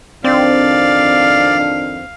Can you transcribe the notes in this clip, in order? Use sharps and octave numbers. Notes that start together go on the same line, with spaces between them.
F2 D#3 C4 D4 D5 F5